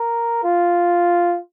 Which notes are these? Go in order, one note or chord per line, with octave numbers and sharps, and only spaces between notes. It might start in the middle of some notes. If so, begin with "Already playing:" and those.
Already playing: A#4
F4